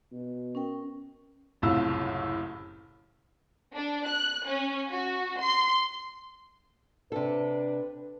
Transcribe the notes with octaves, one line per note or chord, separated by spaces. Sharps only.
B2
C#4 A#4 G5
F#1 C2 A2 F4 E6
D4
F#6
C#4
F#4
C6
C3 D4 A4 B4